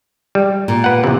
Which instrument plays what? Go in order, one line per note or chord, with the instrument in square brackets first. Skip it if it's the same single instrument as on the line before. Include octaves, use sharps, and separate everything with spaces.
[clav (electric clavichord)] G3
[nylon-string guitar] A#2
[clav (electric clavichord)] B4 F#5
E2 C3